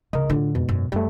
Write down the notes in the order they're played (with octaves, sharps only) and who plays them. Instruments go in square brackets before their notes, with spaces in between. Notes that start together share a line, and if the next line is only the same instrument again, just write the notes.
[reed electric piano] C#2 A#4 D#5 [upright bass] C#3
[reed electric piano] A2 D3 [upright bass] D4 F4
[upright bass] F2 [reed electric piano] G#2 B2
[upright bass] F#2
[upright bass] F#2 [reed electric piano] G3 A3